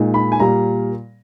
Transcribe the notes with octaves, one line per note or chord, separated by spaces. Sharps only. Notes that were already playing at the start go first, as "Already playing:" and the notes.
Already playing: A#2 G#3 D#4
B5
G#5
A#2 G3 A#3 A#5